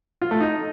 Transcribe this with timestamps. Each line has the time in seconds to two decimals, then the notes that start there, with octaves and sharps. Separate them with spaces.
0.22 F4
0.31 A3
0.40 D#4